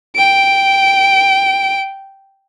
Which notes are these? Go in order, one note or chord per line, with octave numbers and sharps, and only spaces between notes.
G5 D7